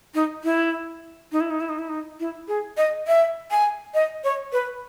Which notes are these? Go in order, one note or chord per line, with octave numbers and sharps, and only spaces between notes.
D#4
E4
D#4
E4
D#4
E4
D#4
E4
D#4
E4
G#4
D#5
E5
G#5
D#5
C#5
B4